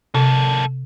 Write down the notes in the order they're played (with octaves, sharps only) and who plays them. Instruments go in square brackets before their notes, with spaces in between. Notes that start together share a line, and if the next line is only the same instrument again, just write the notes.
[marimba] C3 [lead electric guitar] A#3 A4